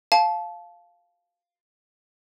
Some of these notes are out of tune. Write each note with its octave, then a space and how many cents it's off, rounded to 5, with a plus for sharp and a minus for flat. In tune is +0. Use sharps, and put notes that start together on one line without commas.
F5 +0 A5 -20